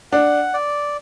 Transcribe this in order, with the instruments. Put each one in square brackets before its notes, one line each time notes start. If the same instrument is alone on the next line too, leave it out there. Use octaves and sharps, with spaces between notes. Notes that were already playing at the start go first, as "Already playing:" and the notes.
[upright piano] D4 [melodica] F#5
[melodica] D5